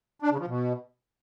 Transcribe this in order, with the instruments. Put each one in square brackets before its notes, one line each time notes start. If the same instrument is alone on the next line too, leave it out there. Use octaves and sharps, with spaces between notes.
[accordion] D4
C#3
F3
B2